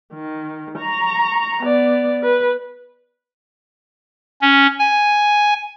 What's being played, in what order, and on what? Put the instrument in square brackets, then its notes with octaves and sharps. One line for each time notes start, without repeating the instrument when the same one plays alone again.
[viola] D#3
A#5 C#6
B3 D5
B4
[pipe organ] C#4
G#5